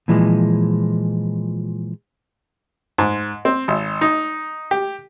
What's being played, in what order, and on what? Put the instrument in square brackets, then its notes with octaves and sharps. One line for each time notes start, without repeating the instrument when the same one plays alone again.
[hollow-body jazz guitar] A#2 E3 F3 G#3
[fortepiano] G#2
C4
G#1
D#4
G4